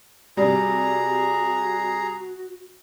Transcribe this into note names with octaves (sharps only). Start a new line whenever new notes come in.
C3 G3 F#4 G#4 A#5